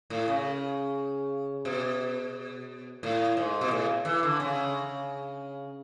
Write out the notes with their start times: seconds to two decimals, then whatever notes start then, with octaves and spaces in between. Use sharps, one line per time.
0.10 A2
0.28 C#3
1.65 B2
3.03 A2
3.37 G#2
3.61 B2
3.71 A2
4.05 E3
4.23 D3
4.40 C#3